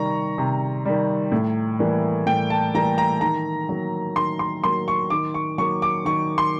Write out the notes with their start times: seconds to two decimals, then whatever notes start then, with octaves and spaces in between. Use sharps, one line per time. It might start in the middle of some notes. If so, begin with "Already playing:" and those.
Already playing: C3 D#3 G3 A#5 C#6
0.38 C3
0.85 D#3 G3
1.32 A2
1.79 E3 G3 A#3
2.26 A2 G5
2.50 A5
2.75 E3 G3 A#3 A#5
2.98 A#5
3.21 D#3 A#5
3.69 F#3 A#3
4.16 D#3 C6
4.39 C6
4.64 F#3 A#3 C6
4.88 C#6
5.10 D#3 D6
5.34 C#6
5.58 F#3 A#3 C#6
5.82 D6
6.05 D#3 C#6
6.38 C6